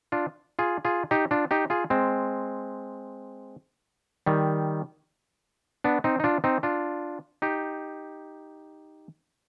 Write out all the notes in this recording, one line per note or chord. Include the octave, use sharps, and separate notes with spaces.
D4 F4
F4 G#4
F4 G#4
D#4 G4
D4 F4
D#4 G4
F4 G#4
G#3 C4
D#3 G3
B3 D4
C4 D#4
D#4
D4 F4
C4 D#4
D4 F4
D#4 G4